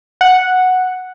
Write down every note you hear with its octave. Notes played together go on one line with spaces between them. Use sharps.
F#5